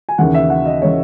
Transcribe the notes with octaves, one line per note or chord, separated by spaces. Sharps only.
G#5
D#2 C#3 E3 F#5
E5
F#5
D#5
C#3 E3 C#5